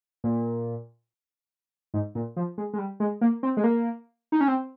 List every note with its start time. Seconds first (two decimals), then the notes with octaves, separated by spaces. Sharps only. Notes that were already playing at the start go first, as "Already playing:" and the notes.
0.24 A#2
1.94 G#2
2.15 A#2
2.37 F3
2.58 G#3
2.74 G#3
2.78 G3
3.00 G#3
3.21 A#3
3.43 C4
3.57 G#3
3.64 A#3
4.32 D#4
4.41 C#4
4.48 C4